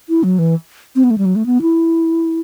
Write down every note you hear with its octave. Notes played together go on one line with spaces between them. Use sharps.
E4
F#3
E3
C4
B3
A3
G3
F#3
A3
B3
E4